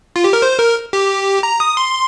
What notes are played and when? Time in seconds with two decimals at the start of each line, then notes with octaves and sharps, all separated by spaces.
0.16 F4
0.24 G4
0.33 A#4
0.42 C5
0.59 A#4
0.93 G4
1.43 A#5
1.60 D#6
1.77 C6